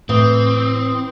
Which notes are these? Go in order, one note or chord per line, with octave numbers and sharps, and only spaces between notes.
A2 E3 C4 D#6